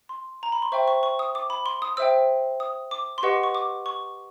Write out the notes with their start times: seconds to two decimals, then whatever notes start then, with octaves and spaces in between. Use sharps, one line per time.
0.09 C6
0.43 A#5
0.52 B5
0.62 C6
0.72 C5 E5 G5 C#6
0.88 C#6
1.03 C#6
1.19 D#6
1.35 D6
1.50 B5
1.66 C6
1.82 D#6
1.97 C5 E5 G5 E6
2.60 D#6
2.91 D6
3.18 C6
3.23 G4 B4 D#5 F#5 C#6
3.43 C#6
3.55 D6
3.86 C#6